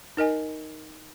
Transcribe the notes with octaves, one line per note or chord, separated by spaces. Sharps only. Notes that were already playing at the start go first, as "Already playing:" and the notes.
D#4 A#4 D#5 G#5